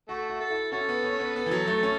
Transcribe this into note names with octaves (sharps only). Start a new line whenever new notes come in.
A3 F#4
F#4
A4
E4
C#4 F#4 A4
B3
C#4
C#5
B3 B4
B3 A4
E3
F#3
A3
C#4